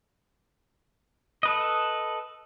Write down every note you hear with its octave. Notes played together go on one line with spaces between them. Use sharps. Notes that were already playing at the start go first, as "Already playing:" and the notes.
A4 B4 D#5